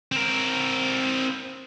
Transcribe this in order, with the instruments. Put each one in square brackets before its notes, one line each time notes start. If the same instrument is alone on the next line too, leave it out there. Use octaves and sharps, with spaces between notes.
[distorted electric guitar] C4 A#4